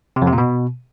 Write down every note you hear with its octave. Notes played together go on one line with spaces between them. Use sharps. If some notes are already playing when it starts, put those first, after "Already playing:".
C3
F2
C3
A#2
B2